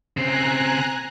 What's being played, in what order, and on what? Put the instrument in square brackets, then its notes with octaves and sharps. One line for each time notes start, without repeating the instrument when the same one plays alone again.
[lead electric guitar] C#3 C4 [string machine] G#5 A#5 F#6